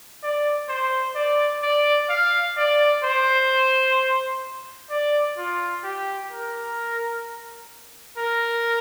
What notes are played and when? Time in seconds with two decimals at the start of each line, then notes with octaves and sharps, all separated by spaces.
0.23 D5
0.69 C5
1.16 D5
1.63 D5
2.10 F5
2.57 D5
3.04 C5
4.90 D5
5.37 F4
5.84 G4
6.32 A#4
8.18 A#4